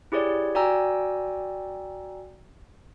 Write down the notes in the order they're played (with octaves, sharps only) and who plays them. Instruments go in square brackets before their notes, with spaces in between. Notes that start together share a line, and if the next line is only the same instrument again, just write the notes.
[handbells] E4 G4 G#4 C#5 D5
F#4 D5 G5 G#5 A#5 E6